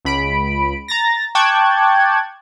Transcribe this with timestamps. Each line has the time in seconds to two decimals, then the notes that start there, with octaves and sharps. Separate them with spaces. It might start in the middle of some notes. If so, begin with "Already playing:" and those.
0.05 C#2 B5 D7
0.88 A#5 A6 A#6
1.35 G5 A5 C#6 D6 F#6 G#6